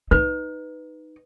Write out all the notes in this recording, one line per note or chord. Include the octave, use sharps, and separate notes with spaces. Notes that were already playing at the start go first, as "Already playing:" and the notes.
D#4 B4